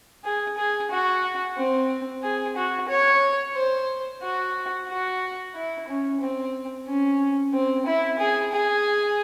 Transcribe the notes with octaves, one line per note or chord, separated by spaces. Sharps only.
G#4
G#4
F#4
C4
G#4
F#4
C#5
C5
F#4
F#4
E4
C#4
C4
C#4
C4
E4
G#4
G#4